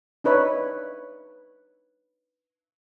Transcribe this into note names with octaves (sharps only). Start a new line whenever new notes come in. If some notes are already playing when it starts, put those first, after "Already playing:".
D4 D#4 B4 C#5 E5